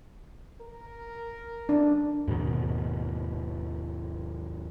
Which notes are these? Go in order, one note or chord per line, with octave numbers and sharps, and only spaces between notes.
A#4
D4
D#2 G#2 B2 D#3